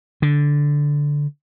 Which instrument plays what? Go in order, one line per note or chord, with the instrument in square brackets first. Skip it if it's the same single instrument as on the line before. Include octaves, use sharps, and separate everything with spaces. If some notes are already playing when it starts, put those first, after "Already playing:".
[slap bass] D3